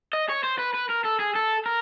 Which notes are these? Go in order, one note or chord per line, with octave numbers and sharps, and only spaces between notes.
D#5
C#5
C5
B4
B4
A#4
A4
G#4
A4
A#4